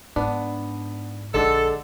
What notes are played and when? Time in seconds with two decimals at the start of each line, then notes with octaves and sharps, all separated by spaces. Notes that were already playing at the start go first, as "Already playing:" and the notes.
0.16 G#2 B3 D4
1.34 A#1 D3 G#3 D4 A4